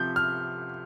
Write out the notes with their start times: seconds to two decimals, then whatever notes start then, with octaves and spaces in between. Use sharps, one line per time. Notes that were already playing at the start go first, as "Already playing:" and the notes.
Already playing: C3 F3 G6
0.16 F6